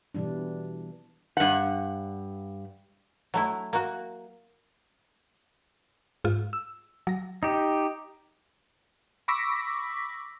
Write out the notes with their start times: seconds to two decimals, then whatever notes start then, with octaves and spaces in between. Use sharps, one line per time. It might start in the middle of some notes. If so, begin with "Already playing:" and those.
0.15 B2 E3 G3 D4
1.37 G2 F#5
3.34 F#3 A3 E4
3.73 A#3 F#4
6.24 G#2 F4
6.53 E6
7.07 F#3 A#6
7.43 D#4 G4
9.28 B5 C#6 D6 E6 A#6 B6